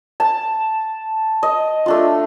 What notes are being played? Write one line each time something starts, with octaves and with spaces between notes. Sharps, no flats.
A5
D#5
A3 D4 F4